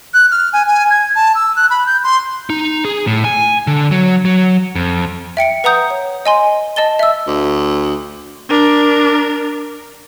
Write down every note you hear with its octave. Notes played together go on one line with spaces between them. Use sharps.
F#6
F6
G#5
G#5
G#6
A5
E6
F#6
B5
G6
C6
D#4
G#4
A2
G#5
D3
F#3
F#3
F2
E5 G5 C#7 D7
B4 F#5 A#5 D#6 G6
C#5
D#5 G#5 C6
D#5 A5 A6 G7
E5 E6
D2
D4 A#4